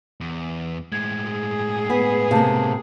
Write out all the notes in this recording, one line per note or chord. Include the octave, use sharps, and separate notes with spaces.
E2
A2 G#3 G#6
G#4
B3
C3 A#3 F5 A5